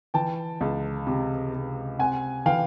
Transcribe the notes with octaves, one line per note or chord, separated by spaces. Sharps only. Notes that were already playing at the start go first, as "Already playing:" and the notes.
E3 G5 A5
C#2
C3
C3
C4 F#5 G#5
E3 F5 G5